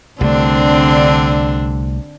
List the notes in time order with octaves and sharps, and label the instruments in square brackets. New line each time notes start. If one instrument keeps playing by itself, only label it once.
[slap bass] C2 A3 [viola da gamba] D3 C4 D4